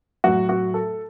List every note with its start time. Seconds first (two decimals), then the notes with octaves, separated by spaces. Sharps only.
0.24 A2 F#3 F#4
0.49 F#4
0.74 A4